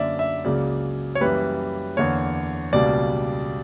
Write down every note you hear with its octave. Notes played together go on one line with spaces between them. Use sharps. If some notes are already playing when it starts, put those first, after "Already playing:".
Already playing: F#2 D3 A#3 D5 E5
E5
C#2 C#3 F#3 A#3 D5
C#5
F#2 E3 G3 A#3 B4
E2 D3 A#3 C#5
C#2 B2 G3 A#3 D5